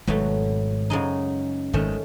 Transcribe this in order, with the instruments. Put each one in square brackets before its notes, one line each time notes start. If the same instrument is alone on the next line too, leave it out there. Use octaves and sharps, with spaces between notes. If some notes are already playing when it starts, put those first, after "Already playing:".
[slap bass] G#1 G#2 [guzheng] B2 F#3 A3
[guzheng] F#2 C#3 G#3 D#4
[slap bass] G#1 G#2 [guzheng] D#3 A3 C#4